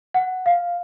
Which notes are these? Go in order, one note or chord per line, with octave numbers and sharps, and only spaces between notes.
F#5
F5